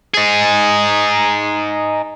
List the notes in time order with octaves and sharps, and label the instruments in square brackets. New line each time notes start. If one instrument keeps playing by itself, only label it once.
[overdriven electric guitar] D#4 G#4